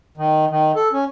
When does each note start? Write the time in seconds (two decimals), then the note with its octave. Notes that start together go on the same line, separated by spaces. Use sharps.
0.17 D#3
0.51 D#3
0.76 A4
0.93 C#4